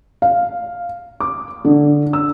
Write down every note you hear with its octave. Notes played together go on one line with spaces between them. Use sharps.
F5
D6
D3
E6